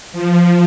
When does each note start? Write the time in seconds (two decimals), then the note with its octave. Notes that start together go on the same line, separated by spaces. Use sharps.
0.12 F3